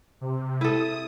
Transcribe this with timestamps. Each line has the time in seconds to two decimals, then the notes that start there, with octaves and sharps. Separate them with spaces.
0.21 C3
0.61 E4 A4 D#6